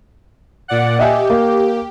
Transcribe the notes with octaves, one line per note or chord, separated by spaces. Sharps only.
A#2 D5 F#5
G4 D#5 E5 G#5
A#3